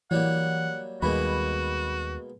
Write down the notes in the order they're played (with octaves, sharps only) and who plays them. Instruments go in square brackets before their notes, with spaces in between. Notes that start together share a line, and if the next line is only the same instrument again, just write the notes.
[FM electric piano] E3 [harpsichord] F#3 G3 A#3 [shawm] F#5
[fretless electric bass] D#2 G3 [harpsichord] B2 G#3 A#3 [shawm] F#4 [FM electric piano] B5